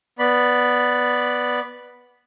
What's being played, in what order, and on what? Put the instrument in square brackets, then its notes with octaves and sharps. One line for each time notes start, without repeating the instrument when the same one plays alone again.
[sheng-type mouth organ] B3 D5 B5